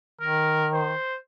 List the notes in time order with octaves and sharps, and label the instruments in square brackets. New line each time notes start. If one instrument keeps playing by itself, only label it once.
[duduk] D#3 [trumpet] A#4
[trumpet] C5